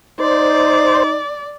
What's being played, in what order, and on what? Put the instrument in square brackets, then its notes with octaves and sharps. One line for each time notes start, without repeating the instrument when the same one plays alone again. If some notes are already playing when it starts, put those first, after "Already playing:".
[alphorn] D#4 [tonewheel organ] C5 [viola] D5